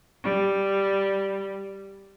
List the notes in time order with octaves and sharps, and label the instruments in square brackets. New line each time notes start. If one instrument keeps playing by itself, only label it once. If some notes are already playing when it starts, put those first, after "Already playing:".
[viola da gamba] G3